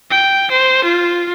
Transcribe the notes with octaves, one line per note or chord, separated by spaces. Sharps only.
G5
C5
F4